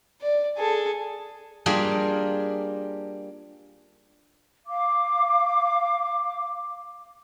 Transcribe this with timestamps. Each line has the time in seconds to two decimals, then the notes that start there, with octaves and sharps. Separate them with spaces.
0.21 D5
0.57 G#4 A4
1.66 G3 A#3 D4 F4 G#4 A#4
4.67 F5 D6